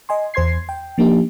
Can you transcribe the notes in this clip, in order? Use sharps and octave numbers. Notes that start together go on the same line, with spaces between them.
D#5 G#5 C6
E2 C5 C6 G#6 C7
G5
F3 A#3 D4 D#4 G4